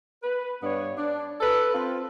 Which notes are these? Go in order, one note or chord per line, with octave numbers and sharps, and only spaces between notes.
B4
G2 B3 D4 C#5
D4
A4 B4
C4 F4